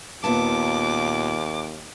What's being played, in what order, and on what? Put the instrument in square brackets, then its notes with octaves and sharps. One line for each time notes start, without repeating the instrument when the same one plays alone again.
[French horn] D#2 [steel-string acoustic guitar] A#2 B3 A5 [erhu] D6